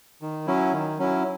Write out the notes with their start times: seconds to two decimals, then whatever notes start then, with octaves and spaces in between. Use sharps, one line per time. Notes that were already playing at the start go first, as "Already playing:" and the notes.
0.22 D#3
0.47 F#3 C#4 E4
0.73 D#3
0.98 F#3 C#4 E4